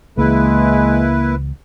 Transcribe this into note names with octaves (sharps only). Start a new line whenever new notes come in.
C#2 E3 G#3 A#3 E4 B4